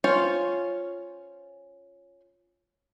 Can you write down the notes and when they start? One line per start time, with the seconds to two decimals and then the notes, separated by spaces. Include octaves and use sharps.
0.04 C#4 F4 C5 C#5